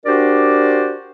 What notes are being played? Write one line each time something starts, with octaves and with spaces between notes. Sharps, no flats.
D4 F#4 G4 A#4 C5 D5